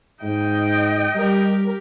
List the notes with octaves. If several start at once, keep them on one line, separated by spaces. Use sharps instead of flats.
G#2 D#5 G5
G3 G4 A#4